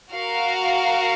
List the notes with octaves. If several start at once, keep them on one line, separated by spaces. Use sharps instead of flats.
F#4 A#4 F5